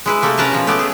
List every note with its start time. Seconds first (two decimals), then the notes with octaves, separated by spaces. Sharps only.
0.06 G#3 E4 B4
0.22 C3 A3 A#3
0.38 C#4 A#4 B4 A5 A#5
0.52 B2 F3
0.67 A3 B3 G4
0.79 G#4